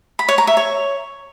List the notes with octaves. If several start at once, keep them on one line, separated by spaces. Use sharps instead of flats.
B5
C#5
A#5
E5
C#5